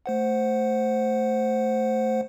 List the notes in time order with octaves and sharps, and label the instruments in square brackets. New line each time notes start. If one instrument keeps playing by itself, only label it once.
[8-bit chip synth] A3 C5 F#5